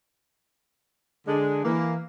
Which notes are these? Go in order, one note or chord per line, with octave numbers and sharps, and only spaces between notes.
D3 G#3 D4
E3 A#3